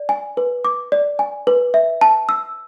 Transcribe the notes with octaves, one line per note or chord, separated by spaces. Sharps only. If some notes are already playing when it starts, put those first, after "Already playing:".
Already playing: D5
G#5
B4
D6
D5
G#5
B4
E5
A5
E6